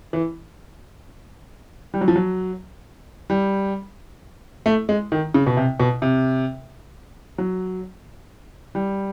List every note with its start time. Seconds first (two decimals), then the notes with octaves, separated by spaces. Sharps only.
0.13 E3
1.94 G3
2.01 F#3
2.08 F3
2.16 F#3
3.30 G3
4.66 A3
4.89 G#3
5.12 D#3
5.34 C#3
5.47 B2
5.57 C3
5.80 B2
6.02 C3
7.38 F#3
8.75 G3